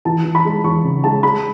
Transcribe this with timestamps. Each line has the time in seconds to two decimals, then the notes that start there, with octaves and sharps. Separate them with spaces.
0.05 E3 A5
0.25 E3
0.35 B5
0.45 G#3
0.64 E2 C#6
0.84 C#3
1.04 G#3 A5
1.23 G#3 B5